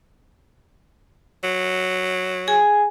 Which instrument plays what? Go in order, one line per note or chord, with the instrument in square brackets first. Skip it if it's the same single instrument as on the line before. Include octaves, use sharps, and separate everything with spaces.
[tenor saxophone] F#3
[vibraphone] G#4 G#5